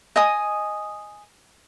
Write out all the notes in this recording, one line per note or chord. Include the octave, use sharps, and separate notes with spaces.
D#5 G#5 D#6